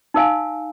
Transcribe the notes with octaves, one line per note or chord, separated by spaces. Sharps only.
D#4 A#4 F5 G#5